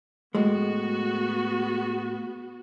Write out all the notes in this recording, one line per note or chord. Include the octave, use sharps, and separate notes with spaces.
A2 G#3 B3 F#4